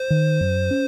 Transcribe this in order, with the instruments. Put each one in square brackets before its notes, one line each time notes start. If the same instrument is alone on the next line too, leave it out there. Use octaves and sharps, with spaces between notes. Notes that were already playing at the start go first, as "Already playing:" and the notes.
Already playing: [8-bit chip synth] C5
[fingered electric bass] D#3
F#2
C#4